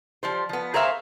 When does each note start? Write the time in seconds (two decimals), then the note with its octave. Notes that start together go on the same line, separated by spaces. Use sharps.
0.23 F3 G3 C5
0.49 F3 B3
0.74 G#4 A#4 C5 C#5 E5 F5